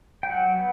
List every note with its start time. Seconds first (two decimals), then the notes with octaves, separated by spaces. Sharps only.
0.23 G5
0.29 F#3 F#5
0.56 B3